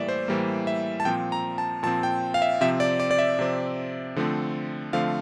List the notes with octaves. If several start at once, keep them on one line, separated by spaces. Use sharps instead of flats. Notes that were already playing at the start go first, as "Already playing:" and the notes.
Already playing: A2 E3 G3 A#3 D5 E5
C5
A2 E3 G3 A#3
E5
A5
A#2 F3 C4 G5
A#5
A5
A#2 F3 C4 A5
G5
F5
E5
C3 F3 C4 E5
D5
D5
D5
E5
C3 F3 C4
D3 F3 A3 C4
D3 F3 A3 C4 F5